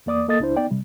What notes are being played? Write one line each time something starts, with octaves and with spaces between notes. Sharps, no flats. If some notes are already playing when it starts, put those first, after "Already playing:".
E2 A#3 D5 D6 D#6
A#3 A4 D#5 D#6 A6
C#2 D4 E4 C5
B3 D#4 D5 G5
C3 G3